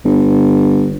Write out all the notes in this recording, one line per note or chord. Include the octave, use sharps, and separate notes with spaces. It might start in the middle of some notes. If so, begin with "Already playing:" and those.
G1